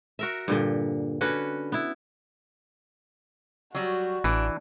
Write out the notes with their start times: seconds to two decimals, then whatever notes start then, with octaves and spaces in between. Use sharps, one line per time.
0.19 F#4 A#4 E5
0.48 G2 A#2 D3
1.21 D3 C#4 F#4 B4
1.72 B3 E4
3.75 F#3 G3 F#4
4.24 A1 E3 D4